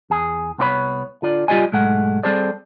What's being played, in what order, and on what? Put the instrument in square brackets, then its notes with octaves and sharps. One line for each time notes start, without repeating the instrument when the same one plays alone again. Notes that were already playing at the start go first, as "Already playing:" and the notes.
[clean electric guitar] E2 G#4
C2 B3 C4 F#4 C#5 B5
D3 F4 D5
G3 F4 G4 D5 D#5 G#5
B1 G#2 G#3 A3 F#5
G3 C4 G#4 A4 C5 D5